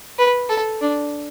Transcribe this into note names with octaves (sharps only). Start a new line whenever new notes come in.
B4
A4
D4